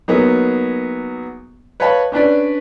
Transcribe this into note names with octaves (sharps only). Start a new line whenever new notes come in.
F#3 A#3 B3 D#4 G#4
B4 C#5 D#5 F5 A5 B5
C#4 D4 B4 D5